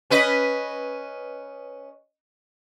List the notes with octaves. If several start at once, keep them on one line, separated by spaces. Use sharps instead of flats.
C#4 B4 D#5